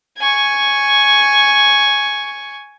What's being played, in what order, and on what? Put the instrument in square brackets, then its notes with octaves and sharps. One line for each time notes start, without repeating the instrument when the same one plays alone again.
[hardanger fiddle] G#5 C#6